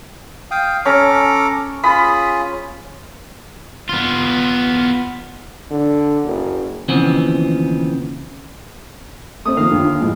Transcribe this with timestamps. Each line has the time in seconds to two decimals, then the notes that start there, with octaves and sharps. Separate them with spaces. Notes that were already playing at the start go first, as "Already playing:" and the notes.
0.51 F5 G5 D#6
0.85 C#4 A4 A#5 D6
1.84 F4 G#4 B5 D#6
3.89 B3 F4
5.71 D3
6.25 F#1
6.89 D#2 C#3 E3 F3 B3 C4
9.45 A3 C4 D#6
9.57 D#3 F3 A#3 F5
9.71 D#2 D3
10.00 A2 F3 G#3